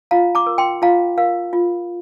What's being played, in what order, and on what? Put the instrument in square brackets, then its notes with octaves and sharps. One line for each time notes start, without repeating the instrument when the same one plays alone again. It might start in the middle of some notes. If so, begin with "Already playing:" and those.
[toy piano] F4 F5 A#5
A#5 D6
A#4
G5 C6
F4 F5 A#5
A#4 F5
F4